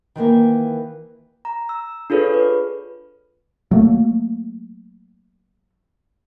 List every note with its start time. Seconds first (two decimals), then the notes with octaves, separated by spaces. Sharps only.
0.16 D#3 E3 A3 A#3
1.45 A#5
1.69 E6
2.10 D4 F4 G#4 A4 B4 C#5
2.34 B4
3.71 F#3 A3 A#3